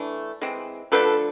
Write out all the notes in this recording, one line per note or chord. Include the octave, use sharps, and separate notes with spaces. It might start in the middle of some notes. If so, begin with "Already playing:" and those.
Already playing: E3 A3 D4
E3 G#3 C4
D3 F3 A3 D4 A4 B4